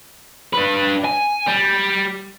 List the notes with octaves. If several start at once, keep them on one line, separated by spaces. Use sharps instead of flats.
D4 B4
G#5
G3